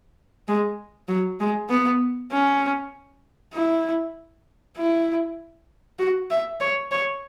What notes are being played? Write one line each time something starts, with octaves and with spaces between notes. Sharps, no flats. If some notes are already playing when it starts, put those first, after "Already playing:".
G#3
F#3
G#3
B3
C#4
E4
E4
F#4
E5
C#5
C#5